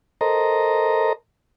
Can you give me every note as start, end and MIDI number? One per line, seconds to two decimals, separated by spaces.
0.21 1.13 69
0.21 1.13 70
0.21 1.13 72
0.21 1.13 75
0.21 1.13 82